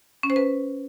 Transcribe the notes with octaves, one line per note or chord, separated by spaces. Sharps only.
C#4
C5
B4